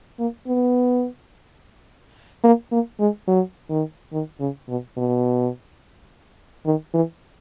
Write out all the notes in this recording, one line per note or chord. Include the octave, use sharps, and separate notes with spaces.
A#3
B3
A#3
A#3
G#3
F#3
D#3
D#3
C#3
B2
B2
D#3
E3